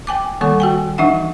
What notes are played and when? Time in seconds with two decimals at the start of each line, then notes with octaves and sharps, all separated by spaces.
0.07 G5 G#5 D6
0.41 D#3 G3 A#3 A4 C#6
0.60 F#4 G5 G#5
0.98 E3 D4 D#4 E5 F#5